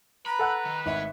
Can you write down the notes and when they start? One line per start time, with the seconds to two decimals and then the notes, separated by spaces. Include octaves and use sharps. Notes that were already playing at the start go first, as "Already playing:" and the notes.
0.26 B4 A#5 B5
0.39 A4 F#5 F#6
0.65 D#3
0.86 G#1 A2 C#5 E5